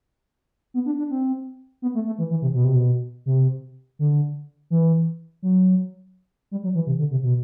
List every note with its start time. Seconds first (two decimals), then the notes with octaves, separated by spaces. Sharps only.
0.74 B3
0.86 D4
0.98 D4
1.10 C4
1.82 B3
1.95 A3
2.07 A3
2.18 E3
2.30 E3
2.42 C3
2.54 B2
2.65 C3
2.76 B2
3.26 C3
3.99 D3
4.70 E3
5.42 F#3
6.51 G3
6.64 F#3
6.75 E3
6.87 C3
6.99 D3
7.11 C3
7.23 B2